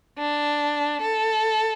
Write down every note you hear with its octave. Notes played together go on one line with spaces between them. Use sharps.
D4
A4